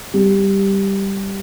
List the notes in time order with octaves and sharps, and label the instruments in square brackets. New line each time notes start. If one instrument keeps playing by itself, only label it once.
[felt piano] G3